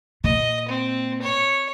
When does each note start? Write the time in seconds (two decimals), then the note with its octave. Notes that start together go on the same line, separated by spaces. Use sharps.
0.24 A#2 D#5
0.68 C4
1.22 C#5